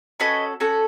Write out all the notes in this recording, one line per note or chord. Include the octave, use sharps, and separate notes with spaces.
C#4 F#4 A4 B4 D#5
C#4 F#4 A4